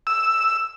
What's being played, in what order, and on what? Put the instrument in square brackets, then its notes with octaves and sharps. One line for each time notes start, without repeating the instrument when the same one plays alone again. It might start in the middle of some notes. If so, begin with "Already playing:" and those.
[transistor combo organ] E6